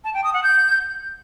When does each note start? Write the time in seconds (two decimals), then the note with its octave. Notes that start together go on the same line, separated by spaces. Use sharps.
0.04 A5
0.14 G5
0.24 D#6
0.34 F#5
0.43 G6